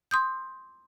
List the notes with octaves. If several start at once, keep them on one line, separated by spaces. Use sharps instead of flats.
C6 D#6 G6